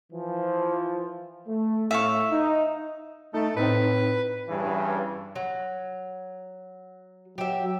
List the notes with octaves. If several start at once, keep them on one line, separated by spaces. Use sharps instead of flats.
E3 F3
A3
A2 E5 F5 C#6
D#4
A3 D#4 A4
A2 C4 D#4 B4
G2 C#3 E3
F#3
F#3 G4 E5